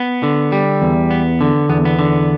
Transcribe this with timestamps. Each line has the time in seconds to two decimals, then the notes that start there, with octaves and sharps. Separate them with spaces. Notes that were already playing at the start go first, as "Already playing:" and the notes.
Already playing: B3
0.23 D3
0.52 G3
0.82 E2
1.11 B3
1.41 D3
1.69 E2 B3
1.85 B3
1.99 D3